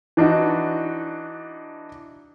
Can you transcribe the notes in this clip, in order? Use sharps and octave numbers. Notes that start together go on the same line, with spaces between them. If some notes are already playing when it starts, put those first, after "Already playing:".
E3 D4 D#4 F#4